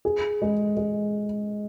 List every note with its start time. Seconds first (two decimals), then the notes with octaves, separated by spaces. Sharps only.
0.05 G#4
0.42 G#3
0.77 G#3